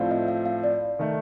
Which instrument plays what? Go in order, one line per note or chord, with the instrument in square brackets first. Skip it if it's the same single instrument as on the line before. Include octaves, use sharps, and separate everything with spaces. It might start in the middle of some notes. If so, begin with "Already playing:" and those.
Already playing: [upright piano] A2 F3 A3 C4 F4 [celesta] D5 F5
[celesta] D#5
F5
F5
D5
[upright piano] D#3 A3